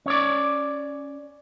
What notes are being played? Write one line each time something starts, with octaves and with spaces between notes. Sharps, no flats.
C#4 C#5 D5